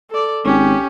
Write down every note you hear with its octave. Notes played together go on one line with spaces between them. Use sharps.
A4 D5
G#1 C#4 G4